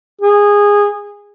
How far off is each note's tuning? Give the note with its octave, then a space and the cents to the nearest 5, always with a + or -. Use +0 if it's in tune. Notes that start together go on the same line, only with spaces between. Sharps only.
G#4 -20